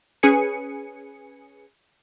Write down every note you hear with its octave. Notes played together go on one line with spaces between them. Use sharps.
C#4 G#4 B4 G#5 C#7